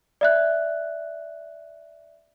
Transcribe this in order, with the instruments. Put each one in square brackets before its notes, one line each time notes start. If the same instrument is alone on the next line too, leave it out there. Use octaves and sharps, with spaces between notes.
[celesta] D5 E5 F#6